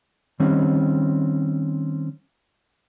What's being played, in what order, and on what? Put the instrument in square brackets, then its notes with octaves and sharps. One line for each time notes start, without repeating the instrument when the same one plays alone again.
[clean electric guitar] D#3 G3 C4 C#4